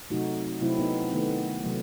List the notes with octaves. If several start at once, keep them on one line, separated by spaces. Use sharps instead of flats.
C3 F#3 A3 D#4 F#4
C3 F#3 A3 C4 E4
B3 D#4
D#3 A3 B3
C3 F#3 A3